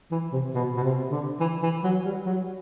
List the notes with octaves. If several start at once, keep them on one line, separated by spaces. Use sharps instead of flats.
E3
C3
B2
B2
C3
D3
E3
E3
F#3
G3
F#3